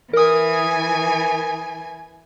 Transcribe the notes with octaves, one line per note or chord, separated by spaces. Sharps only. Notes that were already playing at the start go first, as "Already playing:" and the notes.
E3 A#4 G#5 D#6